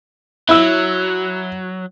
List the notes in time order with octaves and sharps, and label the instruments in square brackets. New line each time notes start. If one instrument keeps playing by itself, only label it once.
[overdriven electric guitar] F#3 [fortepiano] E4 E6